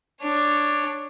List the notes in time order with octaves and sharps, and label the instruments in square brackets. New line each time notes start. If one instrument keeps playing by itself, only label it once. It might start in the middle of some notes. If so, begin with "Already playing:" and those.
[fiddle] D4 C#5